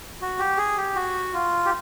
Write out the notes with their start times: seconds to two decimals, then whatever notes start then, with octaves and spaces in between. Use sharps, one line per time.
0.21 F#4
0.39 G4
0.58 G#4
0.78 G4
0.95 F#4
1.33 F4
1.65 G4